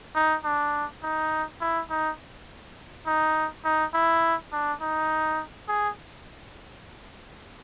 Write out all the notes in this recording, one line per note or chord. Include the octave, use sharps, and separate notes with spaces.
D#4
D4
D#4
E4
D#4
D#4
D#4
E4
D4
D#4
G#4